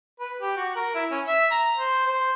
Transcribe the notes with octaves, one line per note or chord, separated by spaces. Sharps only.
B4
G4
F#4
A#4
E4
C#4
E5
A#5
C5
C5